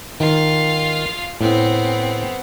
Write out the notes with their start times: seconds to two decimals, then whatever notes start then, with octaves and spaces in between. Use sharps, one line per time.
0.20 D#3 F4 F5
1.41 A2 B3 C4